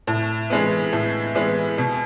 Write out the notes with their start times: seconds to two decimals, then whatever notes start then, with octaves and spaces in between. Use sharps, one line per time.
0.07 A2
0.50 E3 G#3 B3
0.93 A2
1.35 E3 G#3 B3
1.78 B2